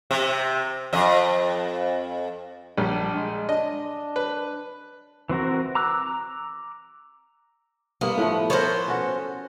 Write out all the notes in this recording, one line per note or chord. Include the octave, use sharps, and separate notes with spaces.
C3
F2 D#5
A#1 G3 D4
G#3
D4 D#5
B4
E3 C4 F#4 A#4
A#5 D6 E6 F#6
G2 A#3 B3
A2 F3 A3
B3 A4 A#4 C5 C#5
C#4 F#4